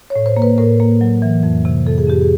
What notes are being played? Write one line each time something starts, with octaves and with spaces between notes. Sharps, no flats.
C#5
A2
C5
A#3
B4
A2 A#4
A#3
F#3
E3
F2
C3
F2 A4
G#4
F2 G4
G#4